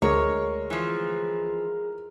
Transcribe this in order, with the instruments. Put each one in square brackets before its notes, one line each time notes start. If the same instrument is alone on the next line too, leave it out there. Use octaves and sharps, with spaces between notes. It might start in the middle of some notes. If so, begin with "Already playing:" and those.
[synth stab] D2 [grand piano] G#3 [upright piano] A#4 [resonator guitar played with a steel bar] C#5
[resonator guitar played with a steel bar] E3 F3